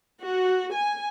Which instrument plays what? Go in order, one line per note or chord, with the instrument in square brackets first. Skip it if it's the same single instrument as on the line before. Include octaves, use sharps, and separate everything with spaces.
[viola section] F#4
G#5